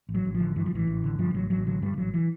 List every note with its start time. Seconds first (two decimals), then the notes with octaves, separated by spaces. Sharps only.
0.09 A1
0.14 F#3
0.25 A1
0.35 F3
0.40 D3
0.56 G2 E3
0.66 F3
0.71 A1 E3
0.87 A1
1.04 D3
1.19 G2 F3
1.34 A1 F#3
1.50 A1 F#3
1.66 D3 F#3
1.82 G2 G3
1.97 A1 F#3
2.14 E3